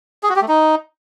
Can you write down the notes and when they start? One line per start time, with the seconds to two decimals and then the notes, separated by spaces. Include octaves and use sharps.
0.23 G#4
0.29 F#4
0.36 G4
0.42 A3
0.48 D#4